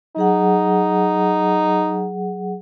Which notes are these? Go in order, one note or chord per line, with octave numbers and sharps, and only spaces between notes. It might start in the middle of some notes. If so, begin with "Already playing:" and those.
F#3 D#4 G#4 F#5